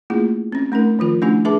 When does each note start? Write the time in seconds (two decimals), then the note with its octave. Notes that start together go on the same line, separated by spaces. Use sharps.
0.10 A3 A#3 C#4 E4 F4 G#4
0.52 C4 C#4
0.72 A3 C#4 D#4 A#4
0.99 D#3 F3 F4 A#4
1.22 A3 C#4 D4 E4 G4 G#5
1.45 D4 G#4 B4 E5 A5 D6